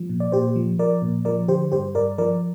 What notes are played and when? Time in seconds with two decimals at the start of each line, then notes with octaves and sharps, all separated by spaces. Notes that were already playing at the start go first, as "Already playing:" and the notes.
Already playing: F3
0.10 A#2
0.20 D5
0.32 A#2 G4 C5
0.56 F3
0.79 F3 A#4 D5
1.02 A#2
1.25 F3 A#4 D5
1.48 D3 G4 C5
1.72 G2 G4 C5
1.95 G2 A#4 D5
2.18 F3 A#4 D5